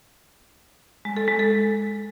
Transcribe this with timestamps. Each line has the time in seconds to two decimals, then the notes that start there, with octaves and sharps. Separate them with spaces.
1.05 G#3
1.17 A4
1.28 G#3
1.39 A4